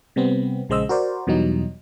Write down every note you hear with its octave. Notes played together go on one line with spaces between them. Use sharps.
C3 G3 B3 C4
A#1 C#3 G#3 C5 D#5 E6
F#4 A#4 C5 D5
E2 B2 E3 F#3 G3 D#4